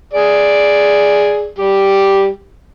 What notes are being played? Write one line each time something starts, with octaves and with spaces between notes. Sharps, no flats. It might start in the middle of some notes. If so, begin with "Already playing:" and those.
G#4 D5
G3 G4